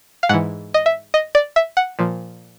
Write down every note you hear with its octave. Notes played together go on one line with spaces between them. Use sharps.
F5
G#2 E3 F#5
D#5
E5
D#5
D5
E5
F#5
A#2 F3